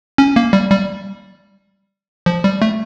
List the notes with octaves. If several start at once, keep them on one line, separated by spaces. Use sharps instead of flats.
C#4
A#3
G3
G3
F3
G3
A3